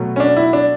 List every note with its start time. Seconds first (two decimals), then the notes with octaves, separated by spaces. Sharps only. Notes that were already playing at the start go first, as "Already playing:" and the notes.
Already playing: B2 F#3 A3
0.16 C#4
0.20 D4
0.37 E4
0.53 D4